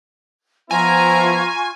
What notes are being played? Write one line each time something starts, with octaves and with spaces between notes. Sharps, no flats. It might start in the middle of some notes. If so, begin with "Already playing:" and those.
F3 B3 E4 F4 G#5 A#5 C#6